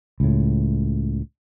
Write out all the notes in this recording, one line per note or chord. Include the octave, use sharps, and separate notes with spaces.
C#2 A2